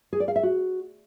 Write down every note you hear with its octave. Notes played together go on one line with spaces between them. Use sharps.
G#4
D5
F5
E5
F#4